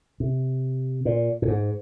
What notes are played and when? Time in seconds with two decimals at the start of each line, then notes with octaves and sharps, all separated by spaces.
0.20 C3
1.05 A#2
1.42 A2
1.48 G#2